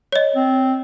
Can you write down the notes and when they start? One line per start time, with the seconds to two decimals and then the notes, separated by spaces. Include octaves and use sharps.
0.12 C#5 D#5
0.35 C4